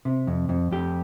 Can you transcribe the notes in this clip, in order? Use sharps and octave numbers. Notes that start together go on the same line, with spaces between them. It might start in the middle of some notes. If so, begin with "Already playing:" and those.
C3
F2
F2
F2 G4